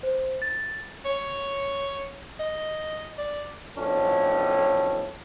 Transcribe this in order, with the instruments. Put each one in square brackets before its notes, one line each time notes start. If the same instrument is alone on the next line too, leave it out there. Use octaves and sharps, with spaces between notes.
[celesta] C5
A6
[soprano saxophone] C#5
D#5
D5
[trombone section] B1 F2 A2 C#4 D4